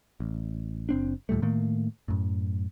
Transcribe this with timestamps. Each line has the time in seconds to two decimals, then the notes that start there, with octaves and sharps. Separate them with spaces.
0.20 A1
0.89 F#1 C4 D4
1.29 D#2 A#2 G3 A3
1.42 A2 D#3 A3 A#3
2.08 F#2 A2